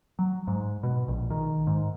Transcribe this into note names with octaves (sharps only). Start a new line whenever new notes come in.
F#3
G#2
B2
A#1
D#3
G#2